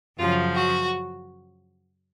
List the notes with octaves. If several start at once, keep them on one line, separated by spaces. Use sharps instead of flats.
F#2 C#3 F3 F4
F#4